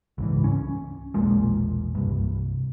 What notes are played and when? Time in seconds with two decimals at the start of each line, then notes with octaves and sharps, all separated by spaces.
0.18 C#2 G#2 E3
0.44 C#4
1.14 E1 A#1 A#2 G#3
1.95 C2 G2